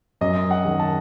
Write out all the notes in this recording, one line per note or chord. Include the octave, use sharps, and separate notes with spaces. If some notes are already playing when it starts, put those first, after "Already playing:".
F#2 D#5
F#5
D#3
A5